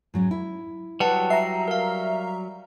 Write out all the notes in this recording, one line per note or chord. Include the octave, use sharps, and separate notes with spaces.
G#2 F#3 C#4
E4
F#3 G3 B4 F#5 A5
E5 A#5 C7
A#4 F5